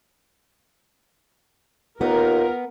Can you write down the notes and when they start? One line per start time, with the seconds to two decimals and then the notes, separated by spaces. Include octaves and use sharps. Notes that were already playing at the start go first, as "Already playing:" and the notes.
2.01 D#2 B3 F4 A#4